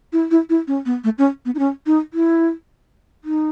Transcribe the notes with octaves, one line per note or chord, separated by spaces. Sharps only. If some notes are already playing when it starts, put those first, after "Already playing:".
E4
E4
E4
C#4
B3
A3
C#4
B3
D#4
C#4
D#4
E4
D#4